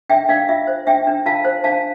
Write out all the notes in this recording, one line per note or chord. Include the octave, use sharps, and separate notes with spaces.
D4 E5 G5
D4 D5 F5
F4 E5
C5
D4 E5 G5
D4
F4 F5 A5
C5
D4 F5 A5